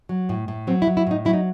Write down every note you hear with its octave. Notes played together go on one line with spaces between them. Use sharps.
F#3
A2
A2
F#3 C4
E4
F#3
E4
A2 D#4
F#3 E4
D#4